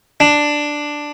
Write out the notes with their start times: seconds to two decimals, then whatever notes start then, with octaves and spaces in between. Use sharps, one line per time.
0.20 D4